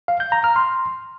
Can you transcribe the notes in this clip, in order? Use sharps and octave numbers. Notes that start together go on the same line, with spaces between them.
F5
G6
A#5
F6
C6